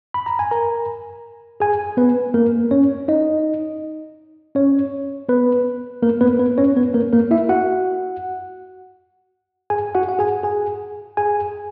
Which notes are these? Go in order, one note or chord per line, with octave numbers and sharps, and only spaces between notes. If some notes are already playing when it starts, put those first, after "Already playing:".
B5
A#5
G#5
A#4 A#5
G#4 G#5
B3 B4
A#3 A#4
C#4 C#5
D#4 D#5
C#4 C#5
B3 B4
A#3 A#4
B3 B4
B3 B4
C#4 C#5
B3 B4
A#3 A#4
A#3 A#4
E4 E5
F#4 F#5
G#4 G#5
F#4 F#5
F#5
G#4 G#5
G#4 G#5
G#4 G#5